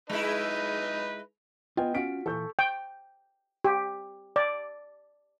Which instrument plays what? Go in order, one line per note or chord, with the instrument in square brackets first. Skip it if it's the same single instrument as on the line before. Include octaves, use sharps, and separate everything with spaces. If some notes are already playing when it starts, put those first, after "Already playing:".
[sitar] G#3 E4 [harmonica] D#4 B4
[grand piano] B3 D#5 G5 [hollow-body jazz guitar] F4 G#5
[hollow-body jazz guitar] C#4 F4 F#4 [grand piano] B6 D7
[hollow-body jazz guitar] A#2 E3 [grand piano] A4 C#6 G6
[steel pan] G5
G4
D5